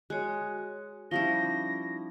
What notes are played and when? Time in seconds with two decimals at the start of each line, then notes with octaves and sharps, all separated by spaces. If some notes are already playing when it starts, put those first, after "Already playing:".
0.10 G#3 F#4 C#5
1.11 F3 G3 C#4 D#4 E4 A#6